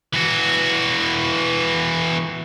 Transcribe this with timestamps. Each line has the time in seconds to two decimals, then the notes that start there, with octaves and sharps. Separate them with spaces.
0.13 E3 F#4